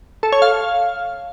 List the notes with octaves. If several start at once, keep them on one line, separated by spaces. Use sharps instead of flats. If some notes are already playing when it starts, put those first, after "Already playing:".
A4
C#5
F5